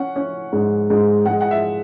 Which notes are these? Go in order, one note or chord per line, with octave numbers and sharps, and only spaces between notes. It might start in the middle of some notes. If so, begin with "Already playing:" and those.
Already playing: C#4 F#5
C#4
G#2
G#2
G#3 F#5
F#5
E5